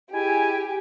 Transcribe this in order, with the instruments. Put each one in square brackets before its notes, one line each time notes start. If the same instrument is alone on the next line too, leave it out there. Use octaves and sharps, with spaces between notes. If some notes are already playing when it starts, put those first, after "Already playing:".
[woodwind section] G#3 E4 G#5 [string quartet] G4